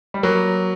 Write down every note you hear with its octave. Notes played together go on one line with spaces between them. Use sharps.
G3
F#3 A#3